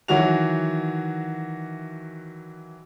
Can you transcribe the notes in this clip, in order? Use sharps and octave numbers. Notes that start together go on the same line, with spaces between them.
D#3 E3 F#3 F#4 F7